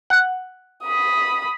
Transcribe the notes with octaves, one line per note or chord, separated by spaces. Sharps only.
F#5
B5 D#6